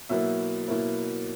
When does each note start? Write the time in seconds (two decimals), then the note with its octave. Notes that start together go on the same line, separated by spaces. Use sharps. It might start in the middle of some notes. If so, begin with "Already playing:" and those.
0.09 B2 F#3 A#3 E4 E5 E6
0.67 B2 F#3 A#3 E4